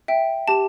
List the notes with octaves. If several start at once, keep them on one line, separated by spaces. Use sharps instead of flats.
E5 G5
G4 A5